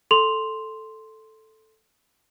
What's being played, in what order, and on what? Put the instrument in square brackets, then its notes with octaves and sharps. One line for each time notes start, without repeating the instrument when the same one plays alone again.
[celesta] A4 C6 F7 F#7